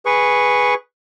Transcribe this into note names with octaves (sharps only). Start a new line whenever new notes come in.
G#4 B4 C#6